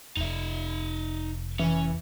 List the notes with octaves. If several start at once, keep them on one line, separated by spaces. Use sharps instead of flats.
F1 D#4 E5
E3 C#4